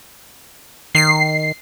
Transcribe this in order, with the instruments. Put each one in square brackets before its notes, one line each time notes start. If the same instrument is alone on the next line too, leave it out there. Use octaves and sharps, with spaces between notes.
[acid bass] D#3 [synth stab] C7